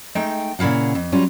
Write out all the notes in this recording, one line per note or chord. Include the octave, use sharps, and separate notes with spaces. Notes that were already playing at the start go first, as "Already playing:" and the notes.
G#3 A3 D#4 G5
A#2 C#3 E4 F5 F#5
F2
F#3 G3 C#4 F4